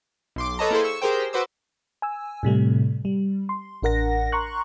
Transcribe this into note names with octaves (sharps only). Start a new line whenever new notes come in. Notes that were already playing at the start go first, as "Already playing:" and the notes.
B1 C6 D6
A4 B4 C#5 D#5 A5 A#5
A#3 E4 G#4 A4 C5
C#6 E6
G4 G#4 A#4 C5 G5
F#4 B4 C5 D6 E6
G#5 E6
A2 C3 G3 A3
G3
C6
A1 D4 A#4 F#5 A#6
A#5 C6 C#6 F#6